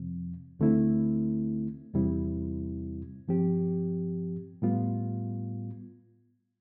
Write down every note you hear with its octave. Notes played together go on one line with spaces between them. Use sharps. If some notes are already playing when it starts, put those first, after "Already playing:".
Already playing: F2 C3 F3 C4
D2 D3 A3 C4 E4
E2 C3 G3 C4 E4
G2 F3 C4 G4
A2 G3 B3 F4